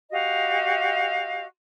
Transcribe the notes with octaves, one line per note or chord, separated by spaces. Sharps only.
F#4 G4 D#5 F5